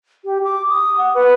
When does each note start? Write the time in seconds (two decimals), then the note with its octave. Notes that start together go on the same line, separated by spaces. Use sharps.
0.25 G4
0.44 D6
0.69 D#6
0.98 F#5
1.15 B4